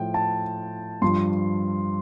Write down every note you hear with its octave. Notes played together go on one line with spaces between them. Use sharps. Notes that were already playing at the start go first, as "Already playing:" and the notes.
Already playing: A2 F3 G5
A5
G2 F3 C6